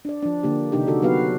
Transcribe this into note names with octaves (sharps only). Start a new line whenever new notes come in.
D4 D5
F3 D4
D3 A#3 G4
C3 D#3 D4 D#4 G4
D3 F#4 A4
F#3 B3 F#4 G4 B4 F5